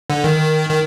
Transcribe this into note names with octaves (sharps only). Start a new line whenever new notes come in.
D3
D#3
D#3